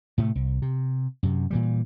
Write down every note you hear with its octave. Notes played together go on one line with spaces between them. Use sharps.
A2 C3 A3
C2
C3
F#2 C3
A#2 E3 G3